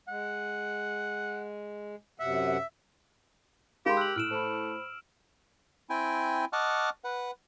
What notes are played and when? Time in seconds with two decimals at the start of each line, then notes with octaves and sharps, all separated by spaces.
0.08 G#3 F#5
2.20 F#2 C3 E5 F#5
3.86 G#3 D#4 G4 A#4 F5 B5 C6
3.97 E6 F#6 F#7
4.16 A2 F6 D7 E7
4.31 A3 C5 B5
5.90 C4 E4 G5 G#5
6.53 D#5 F#5 A5 C#6 D6 F6
7.04 B4 F#5